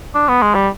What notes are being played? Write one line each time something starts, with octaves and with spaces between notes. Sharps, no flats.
D4
B3
G#3
G3